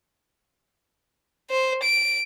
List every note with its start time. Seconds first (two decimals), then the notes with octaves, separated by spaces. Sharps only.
1.50 C5
1.83 D7